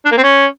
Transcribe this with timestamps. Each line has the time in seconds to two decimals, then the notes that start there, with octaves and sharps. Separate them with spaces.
0.05 D4
0.12 A#3
0.18 C4
0.24 C#4